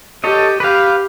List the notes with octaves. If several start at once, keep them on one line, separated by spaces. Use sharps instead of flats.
G4 A4 C#5 D#5
G4 B4 F5